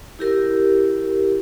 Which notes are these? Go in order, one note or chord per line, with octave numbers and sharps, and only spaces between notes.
E4 G4 A#4